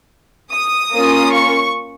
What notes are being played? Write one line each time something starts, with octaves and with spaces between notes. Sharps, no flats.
D#6
A#3 C#4 F4
C#6